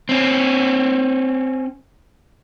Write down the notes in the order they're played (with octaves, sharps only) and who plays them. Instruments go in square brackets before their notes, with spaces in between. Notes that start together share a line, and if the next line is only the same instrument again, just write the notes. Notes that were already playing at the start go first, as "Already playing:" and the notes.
[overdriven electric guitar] C4 C#4